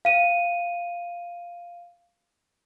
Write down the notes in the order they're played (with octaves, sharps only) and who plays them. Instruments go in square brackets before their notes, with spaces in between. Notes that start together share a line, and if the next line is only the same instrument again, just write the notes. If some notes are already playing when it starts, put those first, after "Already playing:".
[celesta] F5 D#7